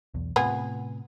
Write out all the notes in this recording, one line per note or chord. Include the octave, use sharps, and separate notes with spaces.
B1 E2
A2 C3 B3 F4 G#4